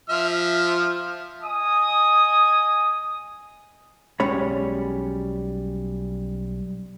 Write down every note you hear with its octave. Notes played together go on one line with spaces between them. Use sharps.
F3 E5 F6
D#5 G#5 D#6
B1 G3 G#3 C#4 C#5 B5